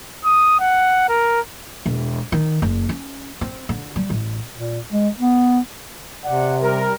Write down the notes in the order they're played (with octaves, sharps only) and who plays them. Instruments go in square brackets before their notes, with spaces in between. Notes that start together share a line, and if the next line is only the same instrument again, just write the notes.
[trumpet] D#6
F#5
A#4
[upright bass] E1
D#3
F#1
C#4
C4
D3
G3
A1
[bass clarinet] A#2
G#3
B3
[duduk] C3 [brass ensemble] D5 F#5
[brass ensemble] G3 A#4